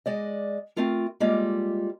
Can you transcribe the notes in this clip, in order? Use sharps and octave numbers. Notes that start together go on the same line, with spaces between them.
G#3 D5 D#5
A3 C4 F4 A#4
G3 G#3 A#3 F4